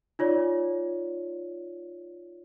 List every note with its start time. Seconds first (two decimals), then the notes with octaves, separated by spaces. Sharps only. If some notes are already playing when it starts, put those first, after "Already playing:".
0.19 D#4 F4 C#5 D5